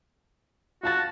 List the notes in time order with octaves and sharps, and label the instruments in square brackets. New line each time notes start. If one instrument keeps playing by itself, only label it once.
[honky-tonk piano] F4 A5 A6 [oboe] F#4